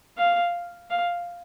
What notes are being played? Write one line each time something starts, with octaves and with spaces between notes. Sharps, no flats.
F5
F5